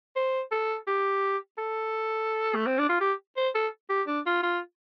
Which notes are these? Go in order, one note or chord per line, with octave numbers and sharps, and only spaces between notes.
C5
A4
G4
A4
A3
C4
D4
F4
G4
C5
A4
G4
D4
F4
F4